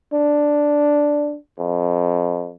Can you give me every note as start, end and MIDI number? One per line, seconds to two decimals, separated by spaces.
0.13 1.36 62
1.59 2.54 41